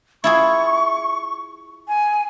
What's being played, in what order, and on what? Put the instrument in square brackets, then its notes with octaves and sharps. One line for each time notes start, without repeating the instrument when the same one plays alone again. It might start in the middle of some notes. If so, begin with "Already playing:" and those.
[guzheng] E4 F4 G#4 [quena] C#6
[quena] G#5